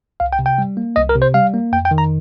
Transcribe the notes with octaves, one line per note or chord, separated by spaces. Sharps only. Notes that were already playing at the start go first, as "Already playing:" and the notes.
C2 F5
G5
C3
G5
G3
A#3
C2 D#5
A#4
C3
C5
G3 F5
A#3
F2 G5
G5
D#3
A#5